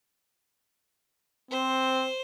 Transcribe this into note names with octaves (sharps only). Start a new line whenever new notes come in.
C4 C5